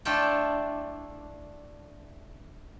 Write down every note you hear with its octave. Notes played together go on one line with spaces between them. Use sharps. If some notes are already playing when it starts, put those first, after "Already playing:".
A3 D4 E4 F4 A4 G5